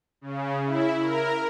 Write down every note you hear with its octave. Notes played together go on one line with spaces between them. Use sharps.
C#3
E4
A#4